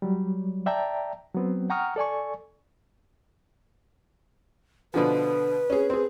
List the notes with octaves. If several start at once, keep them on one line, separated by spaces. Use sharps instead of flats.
F#3 G3
D5 E5 G5 A5 A#5
F#3 B3 C4
F#5 G5 A#5 C#6 D#6 F6
A4 D5 G#5 C#6
B2 D3 F3 B4
C#4 G#4
C4 G#4